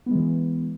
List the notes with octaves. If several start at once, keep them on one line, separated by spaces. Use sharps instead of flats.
E3 G#3 B3